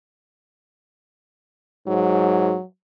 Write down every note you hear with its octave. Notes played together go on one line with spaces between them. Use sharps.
G#2 F#3